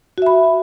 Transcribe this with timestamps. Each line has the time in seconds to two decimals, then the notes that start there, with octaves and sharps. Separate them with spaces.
0.18 F#4
0.22 E5
0.26 B5